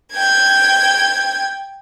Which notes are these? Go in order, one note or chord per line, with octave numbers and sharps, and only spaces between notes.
G5 G#6